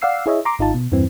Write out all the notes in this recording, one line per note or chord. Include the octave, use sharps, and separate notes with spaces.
D5 F5 F#5 E6 C7
E4 G#4 C#5 D#5 E5
A#5 C6 D6
G#1 D#4 F4 A5
B2
E2 G2 E3 C4